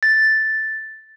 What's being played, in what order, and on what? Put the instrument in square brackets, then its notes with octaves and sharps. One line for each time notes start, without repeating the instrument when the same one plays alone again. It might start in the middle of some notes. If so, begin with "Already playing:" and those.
[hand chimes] A6